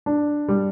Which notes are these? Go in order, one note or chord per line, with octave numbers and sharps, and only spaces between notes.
D4
G3